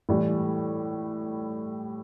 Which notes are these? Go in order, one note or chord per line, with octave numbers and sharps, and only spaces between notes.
A2 E3 G3